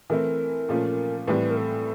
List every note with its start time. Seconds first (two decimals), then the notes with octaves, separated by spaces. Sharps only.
0.10 E3 A3 C4 E4 A#4
0.69 A#2 F3 A3 C#4
1.27 A2 E3 G3 C4 B4
1.51 A#4
1.57 A4